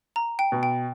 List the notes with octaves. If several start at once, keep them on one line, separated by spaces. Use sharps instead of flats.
A#5
G5
B2
G5